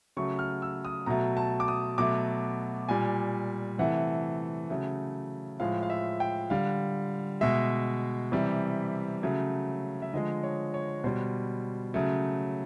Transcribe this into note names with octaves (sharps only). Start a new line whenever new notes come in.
C#3 F#3 A3 C#6
F6
E6
D#6
B2 F#3 A3 A#5
A5
D6
D#6
B2 F#3 A3 D6
A#2 G3 G#5
C3 E3 A3 F#5
C#3 F#3 A3
A2 F3 G#3 F5
F5
E5
G5
D3 G3 F5
B2 G#3 E5
C3 E3 G3
C#3 F#3 A3
E5
D3 F3 G#3 D#5
C#5
C#5
B2 G3 C5
C#3 F#3 A3